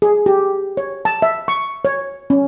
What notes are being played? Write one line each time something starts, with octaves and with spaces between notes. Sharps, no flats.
G#4
G4
C#5
A5
E5
C#6
C#5
C#4